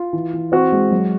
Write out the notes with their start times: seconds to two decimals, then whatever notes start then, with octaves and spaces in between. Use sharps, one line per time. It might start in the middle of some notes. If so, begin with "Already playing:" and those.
Already playing: F4
0.13 E3
0.34 E3
0.52 C4 F#4
0.72 G#3
0.91 F#3